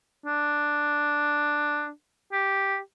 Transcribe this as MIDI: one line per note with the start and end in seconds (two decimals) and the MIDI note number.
0.26 1.89 62
2.32 2.78 67